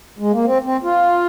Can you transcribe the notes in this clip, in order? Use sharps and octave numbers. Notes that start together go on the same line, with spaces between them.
G#3
A#3
C4
C4
F4